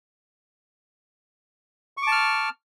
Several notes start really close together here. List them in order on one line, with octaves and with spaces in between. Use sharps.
C#6 D6 A5 F6